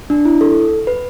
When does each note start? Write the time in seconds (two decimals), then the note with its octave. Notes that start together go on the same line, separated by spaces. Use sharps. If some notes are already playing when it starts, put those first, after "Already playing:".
0.10 D4
0.25 E4
0.41 A4
0.87 B4